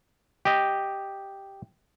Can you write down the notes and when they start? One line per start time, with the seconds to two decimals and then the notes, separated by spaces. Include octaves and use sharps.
0.45 G4 D#5